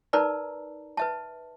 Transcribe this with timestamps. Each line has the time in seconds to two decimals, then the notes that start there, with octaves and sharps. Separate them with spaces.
0.13 D#4 A#4 B4 D5 A5 A#5
0.97 B4 E5 A5